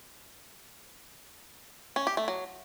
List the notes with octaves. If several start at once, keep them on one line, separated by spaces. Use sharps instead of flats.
C#4
G4
A3
F#3